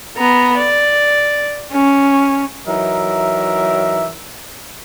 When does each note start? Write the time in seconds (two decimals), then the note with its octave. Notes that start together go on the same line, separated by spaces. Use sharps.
0.17 B3 A#5
0.58 D5
1.72 C#4
2.67 E3 F#3 D#4 A#4 E5